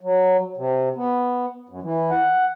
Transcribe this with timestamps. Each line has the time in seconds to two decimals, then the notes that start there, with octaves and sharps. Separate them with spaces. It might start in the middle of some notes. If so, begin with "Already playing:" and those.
0.01 F#3
0.57 C3
0.96 B3
1.69 F#2
1.82 E3
2.11 F#5